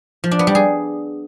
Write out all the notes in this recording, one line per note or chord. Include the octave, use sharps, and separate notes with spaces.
F3
D4
B3
G3
G#4